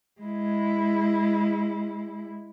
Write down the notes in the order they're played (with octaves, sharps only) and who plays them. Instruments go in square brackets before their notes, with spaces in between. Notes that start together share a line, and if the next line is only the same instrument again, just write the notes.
[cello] G#3 E4